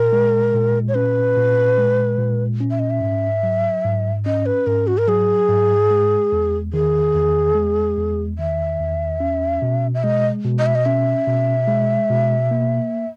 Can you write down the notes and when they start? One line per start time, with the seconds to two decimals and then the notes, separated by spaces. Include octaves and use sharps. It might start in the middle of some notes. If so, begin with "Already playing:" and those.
Already playing: A#2 A#4
0.13 G#3
0.54 A#2
0.88 C#5
0.95 C#4 B4
1.37 A#2
1.78 G#3
2.18 A#2
2.60 C#4
2.71 E5
2.79 D#5
2.90 E5
3.01 G#2
3.43 F#3
3.84 G#2
4.26 C#4 D#5
4.46 B4
4.66 G#2 A#4
4.87 F#4
4.98 A#4
5.07 F#3 G#4
5.49 G#2
5.91 G#3
6.32 E2
6.73 D#3 G#4
7.14 E2
7.55 G#3
7.97 E2
8.38 D#3 E5
8.79 E2
9.20 C#4
9.62 B2
9.94 E5
10.03 G#3 D#5
10.44 B2
10.59 D#5
10.66 E5
10.75 D#5
10.85 C#4 E5
11.27 B2
11.68 G#3
12.10 B2
12.51 A#3